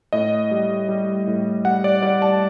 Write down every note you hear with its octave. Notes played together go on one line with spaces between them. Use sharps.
A2 D#5
G3
G3
A2
G3 F#5
D5
G3 D5
A5